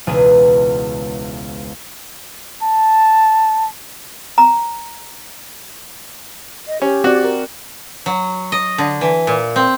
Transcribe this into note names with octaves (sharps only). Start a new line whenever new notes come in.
E1 C#2 B3 G#4 B4 D#7
A5
A#5
D#5
C#4 G4
C4 F#4 D5
A#4
F#3
D#5
D3
E3
A#2
C4